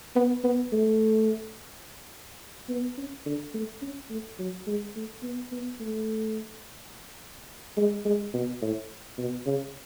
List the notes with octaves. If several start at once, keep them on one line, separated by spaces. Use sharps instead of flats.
B3
B3
A3
B3
C#4
D3
A3
C#4
A3
F#3
G#3
A3
B3
B3
A3
G#3
G#3
B2
A2
B2
C#3